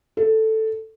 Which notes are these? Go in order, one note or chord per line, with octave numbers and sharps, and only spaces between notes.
A4